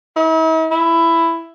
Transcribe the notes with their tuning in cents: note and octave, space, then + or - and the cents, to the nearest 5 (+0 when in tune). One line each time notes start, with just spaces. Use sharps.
E4 -45
E4 +10